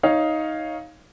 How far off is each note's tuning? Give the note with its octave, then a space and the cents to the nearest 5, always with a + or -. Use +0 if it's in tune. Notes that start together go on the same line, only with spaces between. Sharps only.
D#4 +10 C#5 +0 F5 +0